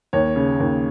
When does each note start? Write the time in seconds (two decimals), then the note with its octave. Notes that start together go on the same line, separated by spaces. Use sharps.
0.13 D#2 C#5
0.36 C#3
0.60 D#2